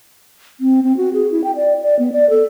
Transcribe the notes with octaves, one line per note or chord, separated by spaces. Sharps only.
C4
C4
F#4
G#4
E4
G5
D5
D5
B3
D5
A4